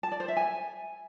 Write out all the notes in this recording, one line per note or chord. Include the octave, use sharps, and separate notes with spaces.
A5
D5
C5
E5
G#5